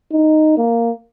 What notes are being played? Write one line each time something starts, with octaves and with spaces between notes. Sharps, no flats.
D#4
A#3